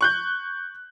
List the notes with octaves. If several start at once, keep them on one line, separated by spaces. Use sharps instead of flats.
C#6 F#6 G6